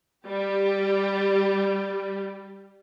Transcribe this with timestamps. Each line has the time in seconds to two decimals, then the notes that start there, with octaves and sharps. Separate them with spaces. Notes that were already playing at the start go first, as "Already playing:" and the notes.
0.25 G3 G4